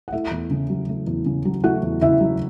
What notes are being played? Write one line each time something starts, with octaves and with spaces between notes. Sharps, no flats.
F#5
A3 E4 E5
E2
C#3
F#3
A3
E2
C#3
F#3
A3 F#4 F#5
E2
C#3 E4 E5
F#3